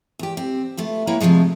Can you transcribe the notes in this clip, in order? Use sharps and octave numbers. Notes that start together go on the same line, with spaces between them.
E2 G4
C4
A3 B3 F4
A#3 E4 B4 C#5 G5
C3 E3 F3 G#3 A3